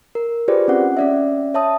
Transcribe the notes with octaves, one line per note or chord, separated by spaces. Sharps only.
A#4
F4 G4 G#4 B4 C5 D5
C4 C#4 F#5
C#4 D5 E5
C#5 E5 A5 D#6